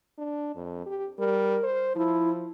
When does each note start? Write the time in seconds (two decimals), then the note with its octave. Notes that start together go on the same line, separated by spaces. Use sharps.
0.18 D4
0.55 F2
0.86 G4
1.19 G3 A#4
1.63 C5
1.96 F3 E4